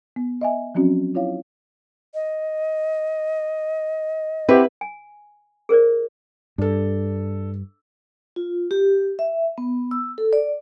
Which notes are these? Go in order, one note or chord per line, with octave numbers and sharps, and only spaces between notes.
B3
D#5 E5 G#5
F3 F#3 C4 C#4 F#4
E4 F4 C#5 F5
D#5
C4 E4 G4 B4 F#5
G#5
G#4 A#4 C5 D5
G2 D4 A4
F4
G4
E5
B3
E6
A4
D5